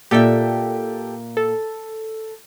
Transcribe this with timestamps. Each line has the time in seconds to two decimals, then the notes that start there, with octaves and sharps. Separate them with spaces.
0.11 A#2 G4 A4 E5 G5
1.37 A4